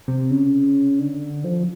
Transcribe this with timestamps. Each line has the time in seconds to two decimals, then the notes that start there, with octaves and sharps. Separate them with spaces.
0.08 C3
0.31 C#3
0.99 D3
1.44 F3